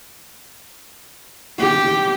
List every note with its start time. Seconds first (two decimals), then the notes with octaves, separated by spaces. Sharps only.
1.59 G4